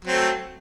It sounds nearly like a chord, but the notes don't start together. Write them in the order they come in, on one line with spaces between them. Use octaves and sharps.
F#3 C4 A3